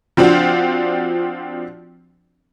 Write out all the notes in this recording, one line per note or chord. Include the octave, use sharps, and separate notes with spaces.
F3 C4 D4 F4 F#4